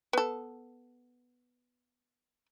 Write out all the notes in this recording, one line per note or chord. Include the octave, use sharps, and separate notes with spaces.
B3 A4